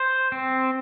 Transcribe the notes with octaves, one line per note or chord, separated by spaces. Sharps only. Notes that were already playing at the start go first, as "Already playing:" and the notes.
Already playing: C5
C4